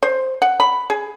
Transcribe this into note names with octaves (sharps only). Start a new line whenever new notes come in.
C5
F#5
B5
G#4